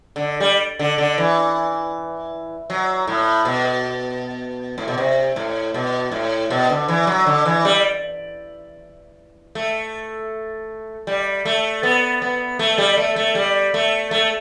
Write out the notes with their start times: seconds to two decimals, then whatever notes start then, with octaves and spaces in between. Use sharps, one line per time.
0.16 D3
0.40 G3
0.79 D3
0.98 D3
1.18 E3
2.70 F#3
3.07 A2
3.45 B2
4.78 A2
4.88 B2
4.98 C3
5.36 A2
5.74 B2
6.11 A2
6.50 B2
6.70 D3
6.88 E3
7.07 F#3
7.27 D3
7.45 E3
7.65 G3
9.55 A3
11.07 G3
11.45 A3
11.83 B3
12.22 B3
12.59 A3
12.78 G3
12.97 A3
13.16 A3
13.35 G3
13.74 A3
14.11 A3